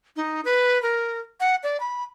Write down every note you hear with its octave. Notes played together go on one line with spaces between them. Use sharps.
D#4
B4
A#4
F#5
D5
B5